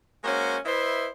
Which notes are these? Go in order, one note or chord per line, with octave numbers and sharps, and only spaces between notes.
G#3 A#3 C#4 F#4 C5
E4 B4 C5 D#5 E5